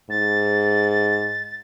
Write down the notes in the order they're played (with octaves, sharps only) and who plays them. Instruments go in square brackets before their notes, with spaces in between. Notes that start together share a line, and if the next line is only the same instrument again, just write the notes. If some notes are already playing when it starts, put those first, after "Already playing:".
[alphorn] G#2 [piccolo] A6